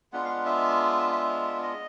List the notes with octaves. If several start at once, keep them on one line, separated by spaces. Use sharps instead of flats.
G#3 B3 D4 F4 F#5
F5
F#5
E5
E5
D#5